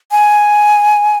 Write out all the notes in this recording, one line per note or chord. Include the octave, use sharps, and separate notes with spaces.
G#5